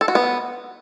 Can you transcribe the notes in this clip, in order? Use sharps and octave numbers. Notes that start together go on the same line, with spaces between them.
A4
F#4
B3